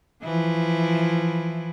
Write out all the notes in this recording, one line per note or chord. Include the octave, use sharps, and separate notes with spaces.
E3 F3 E4